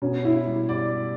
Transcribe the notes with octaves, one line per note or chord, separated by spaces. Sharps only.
B2 C#4
E4
G3
D5